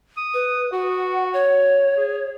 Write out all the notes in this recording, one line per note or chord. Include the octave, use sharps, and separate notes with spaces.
D#6
B4
F#4 F#5
C#5
G#4